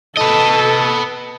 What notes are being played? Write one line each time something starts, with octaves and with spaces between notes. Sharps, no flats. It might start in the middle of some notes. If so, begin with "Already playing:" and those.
A4 B4 D#5